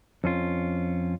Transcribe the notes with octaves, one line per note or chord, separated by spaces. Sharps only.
F2 C#4 F4